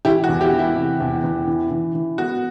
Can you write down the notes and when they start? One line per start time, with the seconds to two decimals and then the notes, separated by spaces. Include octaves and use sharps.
0.05 E3 E4 G4
0.24 F#4
0.29 E2
0.41 E4 G4
0.53 E3
0.59 E4
0.76 C3
1.01 E2
1.24 E2
1.47 E3
1.71 E3
1.95 E3
2.18 B3 F#4